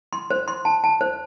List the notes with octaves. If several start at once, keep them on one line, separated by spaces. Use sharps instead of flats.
C6
C5
C6
A5
A5
C5